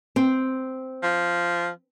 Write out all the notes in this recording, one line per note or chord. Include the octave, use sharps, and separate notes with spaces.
C4
F3